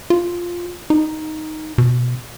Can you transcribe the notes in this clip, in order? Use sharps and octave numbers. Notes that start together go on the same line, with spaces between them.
F4
D#4
B2